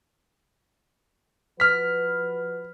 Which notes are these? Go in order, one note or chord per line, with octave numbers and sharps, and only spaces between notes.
F3 F#4 B4 F6 B6